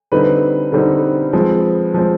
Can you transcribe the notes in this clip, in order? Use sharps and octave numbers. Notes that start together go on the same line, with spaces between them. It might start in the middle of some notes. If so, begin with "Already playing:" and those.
D3 G3 C4 D#4 B4
D3 G3 C4 D#4
F3 G#3 C4
F3 G#3 C4